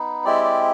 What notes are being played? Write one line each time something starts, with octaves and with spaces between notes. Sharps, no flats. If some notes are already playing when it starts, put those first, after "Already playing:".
Already playing: B3 D#4
G#3 C4 E4 G4 D5
D5